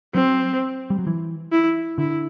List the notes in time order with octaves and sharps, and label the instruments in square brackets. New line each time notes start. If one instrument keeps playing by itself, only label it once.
[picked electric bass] F#3 [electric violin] C4
[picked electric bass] G3
F#3
E3
[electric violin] E4
[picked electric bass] D3 [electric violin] E4